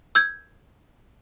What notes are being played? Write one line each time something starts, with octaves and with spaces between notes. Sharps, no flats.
E6 G6 G#6